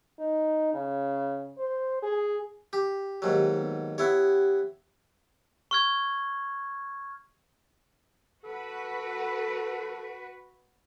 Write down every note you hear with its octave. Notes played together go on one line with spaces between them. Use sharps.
D#4
C#3
C5
G#4
G4
D#2 G#2 F#3 G4
B3
B3 E4 G4 C#5
C#6 F6 G#6
F#4 A4 B4